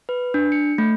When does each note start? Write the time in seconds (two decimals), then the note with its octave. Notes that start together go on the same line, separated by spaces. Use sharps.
0.09 B4
0.34 D4
0.52 C#7
0.78 A3